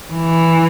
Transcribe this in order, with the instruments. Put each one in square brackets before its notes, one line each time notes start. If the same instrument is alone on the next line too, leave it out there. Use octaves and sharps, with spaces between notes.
[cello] E3